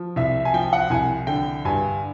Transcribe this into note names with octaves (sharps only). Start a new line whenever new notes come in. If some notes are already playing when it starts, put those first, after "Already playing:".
Already playing: F3
C2 E5
G#5
F3 G5
F#5
C2 G#5
D3 G5
G2 G#5